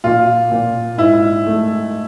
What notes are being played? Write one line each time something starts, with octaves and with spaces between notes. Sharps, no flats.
A#2 F4
A#2
G#2 E4
A3